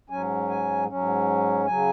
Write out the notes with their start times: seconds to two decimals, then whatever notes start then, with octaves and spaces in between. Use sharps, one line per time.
0.10 G#2 F#3 C#4 G#5
0.49 G#5
0.88 G#2 F#3 C#4
1.66 C#3 F#3 G#5